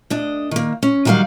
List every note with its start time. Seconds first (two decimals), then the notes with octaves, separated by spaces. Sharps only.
0.10 D2 D4 D#5
0.51 D#3 A#3
0.83 C#4
1.05 D#3 F#3 G3 A#4 F5 F#5